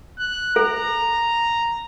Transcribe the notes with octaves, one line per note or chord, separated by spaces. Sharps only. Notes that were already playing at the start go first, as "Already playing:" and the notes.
F#6
A4 A#5